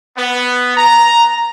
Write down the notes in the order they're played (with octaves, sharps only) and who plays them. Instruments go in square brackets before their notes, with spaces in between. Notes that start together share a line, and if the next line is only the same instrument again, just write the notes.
[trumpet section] B3
A#5